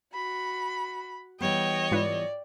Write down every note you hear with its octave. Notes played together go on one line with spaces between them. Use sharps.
F#4 B5
E3 G3 B3 C#5 D#5 G5
G#2 F4 B4 D5